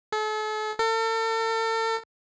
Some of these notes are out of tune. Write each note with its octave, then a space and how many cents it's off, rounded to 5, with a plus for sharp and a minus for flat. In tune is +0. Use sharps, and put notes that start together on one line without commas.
A4 -40
A4 +40